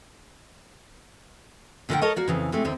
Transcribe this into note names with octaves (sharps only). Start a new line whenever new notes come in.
A#2 D3 A3 A#3 F#5 G5
A4 A#4 C#5 D#5
A#3 F#4 D5
F2 C#3 E3
C3 G#3 A3
D#2 D3 C4